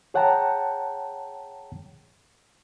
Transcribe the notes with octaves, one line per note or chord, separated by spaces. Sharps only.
G#4 C#5 F#5 G5 A5 A#5